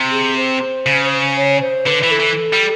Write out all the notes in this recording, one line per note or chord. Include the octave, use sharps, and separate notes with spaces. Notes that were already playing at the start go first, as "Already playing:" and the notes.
Already playing: C3
G#4
C5
C#3
C#5
C5
D3 B4
E3
A4
E3
G3